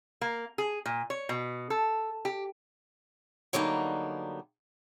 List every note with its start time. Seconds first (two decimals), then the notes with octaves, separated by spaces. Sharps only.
0.21 A#3
0.58 G#4
0.86 A#2
1.10 C#5
1.29 B2
1.70 A4
2.25 G4
3.53 D3 F#3 G3 A#3 B3 D#4